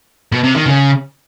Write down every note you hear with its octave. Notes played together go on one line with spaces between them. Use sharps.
B2
C3
D#3
C#3